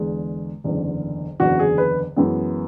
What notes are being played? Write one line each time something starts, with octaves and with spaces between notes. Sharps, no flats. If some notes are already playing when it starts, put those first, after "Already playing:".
Already playing: E2 D3 G#3
F#1 E2 D3
F#1 E2 D3 F#4
G#4
B4
F#2 E3 G#3 B3